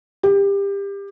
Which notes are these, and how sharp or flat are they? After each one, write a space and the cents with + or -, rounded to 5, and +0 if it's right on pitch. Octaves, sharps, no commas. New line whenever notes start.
G4 +25